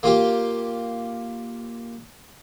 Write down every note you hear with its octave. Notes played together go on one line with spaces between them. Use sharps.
A#3 F4 G4